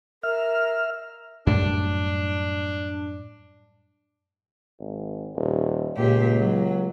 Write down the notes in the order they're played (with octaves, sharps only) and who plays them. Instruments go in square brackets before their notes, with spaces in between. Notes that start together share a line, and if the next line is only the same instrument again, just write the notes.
[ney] A#4 [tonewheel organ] E5 F6
[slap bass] F#2 A2 G3 [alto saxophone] D4
[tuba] G#1
D#1
[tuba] C#2 [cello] A#2 G4
[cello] F#3